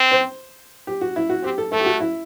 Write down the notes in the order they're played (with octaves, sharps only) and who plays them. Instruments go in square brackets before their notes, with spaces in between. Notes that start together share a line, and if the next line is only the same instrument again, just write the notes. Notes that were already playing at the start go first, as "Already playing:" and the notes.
Already playing: [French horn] C4
[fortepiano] C5
G4
F#4
E4
F#4
[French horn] C4 [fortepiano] G4
[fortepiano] A4
[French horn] A3 [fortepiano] A4
[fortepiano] G4
F#4
E4